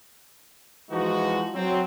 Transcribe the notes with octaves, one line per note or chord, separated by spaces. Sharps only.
E3 F3 G#3 D#4 F#4
F#3 C4